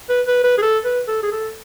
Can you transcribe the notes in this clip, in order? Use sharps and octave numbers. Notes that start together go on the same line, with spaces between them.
B4
B4
B4
G#4
A4
B4
A4
G#4
A4